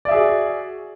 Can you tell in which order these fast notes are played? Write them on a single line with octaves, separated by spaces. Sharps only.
D5 E5 G#4 F#4